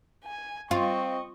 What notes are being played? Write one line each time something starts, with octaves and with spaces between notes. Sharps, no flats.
G#5
C4 F4 D#5 C#6